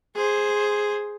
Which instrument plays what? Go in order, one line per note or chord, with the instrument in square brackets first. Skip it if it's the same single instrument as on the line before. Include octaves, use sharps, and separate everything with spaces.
[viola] G#4 C5